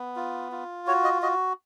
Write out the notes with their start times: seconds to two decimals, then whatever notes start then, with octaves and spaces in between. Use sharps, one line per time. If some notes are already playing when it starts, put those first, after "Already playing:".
Already playing: B3
0.16 F4
0.52 F4
0.87 F#4 C#5
1.04 D#5
1.22 F#4 D#5